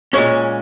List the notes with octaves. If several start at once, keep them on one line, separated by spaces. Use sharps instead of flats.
A#2 G#3 C#4 C#5